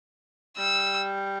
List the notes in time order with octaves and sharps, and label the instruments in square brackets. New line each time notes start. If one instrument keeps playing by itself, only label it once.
[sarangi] G3 [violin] E6